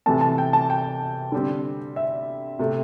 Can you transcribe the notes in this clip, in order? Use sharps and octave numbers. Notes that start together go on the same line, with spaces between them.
C3 E3 A3 C4 A5
A5
G5
A5
G5
D3 G3 C4
E5
C3 A3 C4